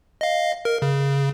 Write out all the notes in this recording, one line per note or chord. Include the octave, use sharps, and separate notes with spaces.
D#5 F5
A#4
C#3